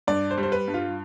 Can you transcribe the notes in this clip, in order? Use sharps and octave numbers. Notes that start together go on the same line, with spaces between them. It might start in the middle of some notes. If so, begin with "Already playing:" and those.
G2 D5
C5
G3
C5
B4
G2
F4